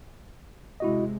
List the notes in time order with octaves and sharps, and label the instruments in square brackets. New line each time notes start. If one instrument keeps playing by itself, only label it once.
[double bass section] C3 G#3 [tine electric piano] E4 F#4 D#5